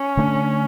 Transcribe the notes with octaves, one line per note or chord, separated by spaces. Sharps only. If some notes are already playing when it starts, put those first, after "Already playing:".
Already playing: C#4
D3 A3 D4